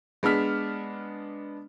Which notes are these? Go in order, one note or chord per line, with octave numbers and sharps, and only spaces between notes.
G#3 B3 D4 F6 B6